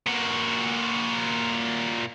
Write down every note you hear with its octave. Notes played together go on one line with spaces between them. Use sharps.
A#2 F#4